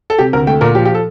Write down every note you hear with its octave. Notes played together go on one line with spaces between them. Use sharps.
A4
C3 G4
D2 A#4
A3 G5
A#2 A#4
F3 G4
G4
A4